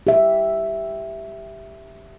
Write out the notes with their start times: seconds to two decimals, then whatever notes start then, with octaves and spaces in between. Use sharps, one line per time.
0.07 G4 E5